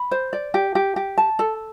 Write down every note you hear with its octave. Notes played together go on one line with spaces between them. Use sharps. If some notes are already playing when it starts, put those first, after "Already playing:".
Already playing: B5
C5
D5
G4
G4
G4
A5
A4